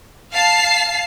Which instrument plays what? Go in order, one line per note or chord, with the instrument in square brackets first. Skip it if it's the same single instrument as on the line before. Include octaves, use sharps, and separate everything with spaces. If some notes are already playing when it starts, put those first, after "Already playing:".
[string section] F5 A5 C7